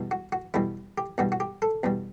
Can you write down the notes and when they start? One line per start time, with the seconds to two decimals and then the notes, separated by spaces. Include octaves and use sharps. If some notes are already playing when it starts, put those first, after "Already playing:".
Already playing: E2 B2 G3
0.11 F#4
0.32 F#4
0.54 E2 B2 G3 E4
0.98 G4
1.18 E2 B2 G3 F#4
1.32 F#4
1.40 G4
1.62 A4
1.83 E2 B2 G3